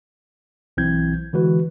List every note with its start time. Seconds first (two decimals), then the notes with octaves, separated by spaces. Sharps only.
0.77 B1 E3 C4 E4 G6 G#6
1.33 D3 E3 G#3 F#4 B4